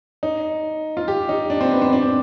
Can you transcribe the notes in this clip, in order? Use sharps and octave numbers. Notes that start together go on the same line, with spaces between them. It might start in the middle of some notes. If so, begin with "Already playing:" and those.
D#4
F4
G4
D#4
D4
C4
B3
C4
D4
C4